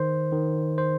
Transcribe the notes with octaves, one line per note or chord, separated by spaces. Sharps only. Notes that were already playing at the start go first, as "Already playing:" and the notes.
Already playing: D#3 C5
D#3
C5